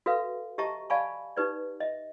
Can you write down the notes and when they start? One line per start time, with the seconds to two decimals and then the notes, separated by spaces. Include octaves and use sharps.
0.06 F#4 A4 B4 E5 F5
0.58 G4 D#5 E5 A5 A#5 C#6
0.90 D5 F5 G#5 A5 B5 C#6
1.36 D#4 G4 B4 D5
1.80 D#5 E5